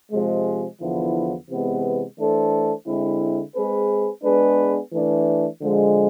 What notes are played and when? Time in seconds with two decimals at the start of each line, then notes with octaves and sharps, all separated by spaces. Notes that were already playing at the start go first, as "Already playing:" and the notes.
0.12 C3 F3 G#3
0.81 E2 D3 F3 B3 E4
1.49 C3 E3 G#3 B3
2.18 E3 A3 D4 A4 C5
2.87 D3 G#3 C4 E4
3.55 G#3 C4 G#4 B4
4.24 G#3 B3 D4 G#4 B4
4.92 E3 A3 D4
5.61 D3 F3 G#3